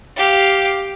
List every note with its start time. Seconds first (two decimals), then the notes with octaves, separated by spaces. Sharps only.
0.16 G4 F5